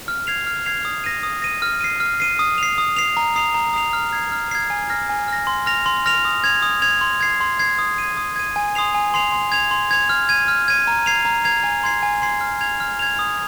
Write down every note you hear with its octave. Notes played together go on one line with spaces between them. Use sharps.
F6
G#6 C7 F7
F6
G#6 C7 F7
D#6
A#6 D#7
D#6
A#6 D#7
F6
C7 D#7
F6
C7 D#7
D#6
C7 F7
D#6
C7 F7
A#5
D#6 C7 F7
A#5
D#6 C7 F7
F6
G#6 C7
F6
G#6 C7
G#5
F6 A#6
G#5
F6 A#6
C6
F6 A#6 F7
C6
F6 A#6 F7
D#6
G#6 F7
D#6
G#6 F7
C6
G#6 C7
C6
G#6 C7
D#6
G#6 D#7
D#6
G#6 D#7
G#5
C6 D#6 C7 F7
G#5
C6 D#6 C7 F7
C6
G#6 F7
C6
G#6 F7
F6
G#6 D#7
F6
G#6 D#7
A#5
G#6 C7 F7
A#5
G#6 C7 F7
G#5
C6 G#6 C7
G#5
C6 G#6 C7
F6
G#6 F7
F6
G#6 F7
D#6